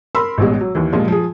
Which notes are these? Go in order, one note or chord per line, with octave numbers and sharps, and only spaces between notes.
A#4 B5 C6 E6
A1 B2 G3 G#3
F#3
D#2 E3
G2 A#2 F3 G#3 F4
F3 G#4